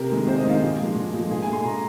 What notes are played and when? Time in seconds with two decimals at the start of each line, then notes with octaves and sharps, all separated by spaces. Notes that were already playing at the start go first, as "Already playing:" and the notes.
Already playing: C3 A#4
0.10 D#3 G#3
0.27 C3 C5
0.38 D#5
0.45 D#3 G#3 F5
0.61 A#2 D#5
0.79 F3 G#3
0.95 A#2
1.13 F3 G#3
1.30 A#2 G#4
1.42 G#3 G#5
1.53 C6
1.65 A#2 A#5